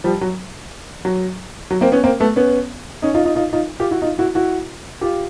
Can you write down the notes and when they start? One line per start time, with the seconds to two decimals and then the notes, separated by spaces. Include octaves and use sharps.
0.04 F3 G3
0.21 F#3
1.05 F#3
1.71 F#3
1.81 A#3 C4
1.92 B3 C#4
2.04 A#3 C4
2.20 A3 B3
2.36 B3 C#4
3.02 C#4 D#4
3.14 D#4 F4
3.24 D#4 F4
3.35 D#4 F4
3.53 D#4 F4
3.80 F4 G4
3.91 E4 F#4
4.02 D#4 F4
4.19 E4 F#4
4.35 E4 F#4
5.01 F4 G4